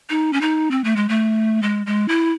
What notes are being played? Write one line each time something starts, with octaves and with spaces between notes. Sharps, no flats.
D#4
C#4
D#4
C4
A3
G#3
A3
G#3
G#3
E4